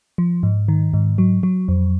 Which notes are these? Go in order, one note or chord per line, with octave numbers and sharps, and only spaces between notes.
F3
G#2
D#3
G#2
F#3
F#3
F2